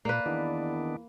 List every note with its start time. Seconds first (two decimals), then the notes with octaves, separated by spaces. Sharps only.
0.05 A#2 A#3 B4 D5
0.26 E2 D#3 B3 D4